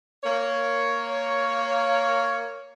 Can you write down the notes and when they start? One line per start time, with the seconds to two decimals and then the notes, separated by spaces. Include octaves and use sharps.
0.24 A#3 C#5